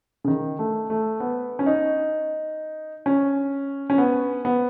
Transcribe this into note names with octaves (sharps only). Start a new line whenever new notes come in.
C#3
D#3
A3
A3
B3
C#4
D#4
C#4
C#4
B3
B3